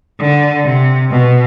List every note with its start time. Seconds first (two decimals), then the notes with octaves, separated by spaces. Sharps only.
0.20 D3
0.65 C3
1.11 B2